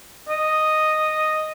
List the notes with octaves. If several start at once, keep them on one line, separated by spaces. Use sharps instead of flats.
D#5